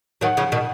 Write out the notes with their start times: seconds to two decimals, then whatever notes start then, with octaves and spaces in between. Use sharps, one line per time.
0.21 D#3 F#3 F#5
0.37 C#3 F3
0.52 B2 D#3